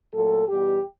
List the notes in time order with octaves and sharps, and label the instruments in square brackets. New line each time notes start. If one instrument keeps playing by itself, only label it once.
[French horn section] A#2 F#3 A3 A4
E2 B2 G3 G4